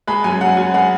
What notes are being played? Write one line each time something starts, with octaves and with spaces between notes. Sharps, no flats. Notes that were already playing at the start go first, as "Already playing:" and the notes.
G#3 B5
F#2 G#5
F#2 F#5
F#2 G#5
G#3 F#5